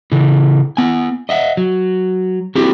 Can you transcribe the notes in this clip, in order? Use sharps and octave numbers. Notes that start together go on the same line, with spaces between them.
C#3 E3
B3 G#5
D#5 E5 F#5
F#3
C4 E4 F#4 G4